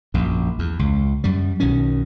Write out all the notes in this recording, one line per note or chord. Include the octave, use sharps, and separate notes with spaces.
A#1 F#2
E2
C#2
F#2 G3
B1 B2 D#3 C#4